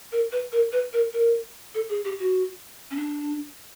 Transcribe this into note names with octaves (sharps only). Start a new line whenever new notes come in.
A#4
B4
A#4
B4
A#4
A#4
A4
G#4
G4
F#4
C#4
D4